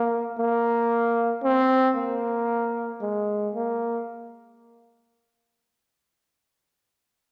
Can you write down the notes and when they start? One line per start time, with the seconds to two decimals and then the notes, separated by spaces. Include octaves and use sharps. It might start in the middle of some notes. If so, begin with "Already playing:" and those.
Already playing: A#3
0.39 A#3
1.44 C4
1.96 A#3
3.02 G#3
3.55 A#3